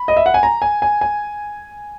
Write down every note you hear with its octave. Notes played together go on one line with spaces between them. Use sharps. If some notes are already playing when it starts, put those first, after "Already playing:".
Already playing: B5
D#5
E5
F#5
G#5
A#5
G#5
G#5
G#5